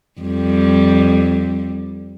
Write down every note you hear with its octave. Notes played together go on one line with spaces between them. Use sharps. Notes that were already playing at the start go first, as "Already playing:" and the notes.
F2 G3